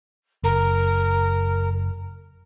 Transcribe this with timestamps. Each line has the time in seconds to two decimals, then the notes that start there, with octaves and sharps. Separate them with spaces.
0.43 F#1 A#4